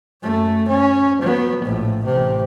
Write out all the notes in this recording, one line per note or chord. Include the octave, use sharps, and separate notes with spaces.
F#2 A3
C#4
F#3 B3
A#1 A2
A1 C3